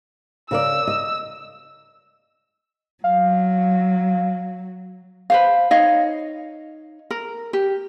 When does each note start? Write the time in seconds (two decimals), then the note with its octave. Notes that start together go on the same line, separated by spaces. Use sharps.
0.51 C#3 A#4 D5 E6
0.87 D#5
3.04 F#3 F5
5.30 B4 C5 F5
5.71 D#4 C#5 D#5 F5
7.11 A#4
7.53 G4